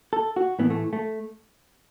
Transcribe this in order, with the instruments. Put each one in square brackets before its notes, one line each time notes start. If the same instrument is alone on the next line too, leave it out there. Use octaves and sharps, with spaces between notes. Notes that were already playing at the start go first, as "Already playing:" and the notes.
[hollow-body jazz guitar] A4
F#4
A2 E3 B3
A3
A3